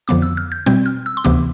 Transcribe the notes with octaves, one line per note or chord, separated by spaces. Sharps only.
F2 D3 F3 B3 D6
E6
F6
G6
B2 G3 C4 G6
F6
E6
C6
D2 C3 E3 B3 D6